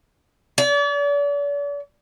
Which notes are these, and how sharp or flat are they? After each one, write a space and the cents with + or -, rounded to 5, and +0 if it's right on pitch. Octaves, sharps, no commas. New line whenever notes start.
D5 -40